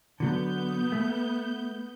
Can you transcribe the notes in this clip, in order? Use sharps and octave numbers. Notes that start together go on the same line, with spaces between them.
D3 F#3 B3 G6
A3